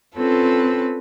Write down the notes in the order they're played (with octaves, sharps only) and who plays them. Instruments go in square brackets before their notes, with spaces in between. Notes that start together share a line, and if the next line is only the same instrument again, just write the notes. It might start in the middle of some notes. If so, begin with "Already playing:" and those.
[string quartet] C4 C#4 F4 A4 B4